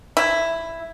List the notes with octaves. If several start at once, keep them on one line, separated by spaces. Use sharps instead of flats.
E4